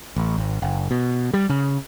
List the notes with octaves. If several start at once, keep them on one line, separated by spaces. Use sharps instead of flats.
A1
G#1
F#1
B2
G3
C#3